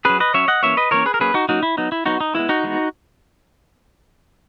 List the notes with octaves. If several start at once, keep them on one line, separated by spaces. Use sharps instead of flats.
F#3 C#4 G#4 B4
B4 D#5
F#3 C#4 C#5 E5
D#5 F#5
E3 A#3 C#4 C#5 E5
B4 D#5
E3 A#3 C#4 A#4 C#5
G#4 B4
A#4
F#3 A#3 C#4 G#4 B4
D#4 F#4
F#3 A#3 C#4 D#4 F#4
E4
F#3 B3 D#4
E4
F#3 B3 D#4 F#4
D#4
E3 G#3 B3 E4
D#4 F#4
E3 G#3 B3